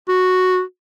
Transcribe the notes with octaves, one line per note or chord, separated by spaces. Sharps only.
F#4